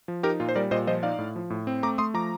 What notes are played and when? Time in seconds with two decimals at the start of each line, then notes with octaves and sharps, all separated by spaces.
0.08 F3
0.23 D#4 G4 A#4
0.40 A#2 F4
0.49 C5
0.55 G3 A#4 D5
0.71 A#2 C5 D#5
0.87 F3 C5 D#5
1.03 D#4 D5 F5
1.19 A2
1.36 F3
1.50 A2
1.67 C4
1.83 A3 A#5 D6
1.98 A3 C6 D#6
2.14 F3 A#5 D6